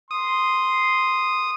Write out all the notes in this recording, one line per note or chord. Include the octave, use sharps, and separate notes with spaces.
C6 D#6